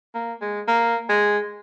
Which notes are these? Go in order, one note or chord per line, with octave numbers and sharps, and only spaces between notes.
A#3
G#3
A#3
G#3